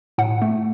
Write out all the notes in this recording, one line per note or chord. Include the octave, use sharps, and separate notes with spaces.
A2 F#5
A3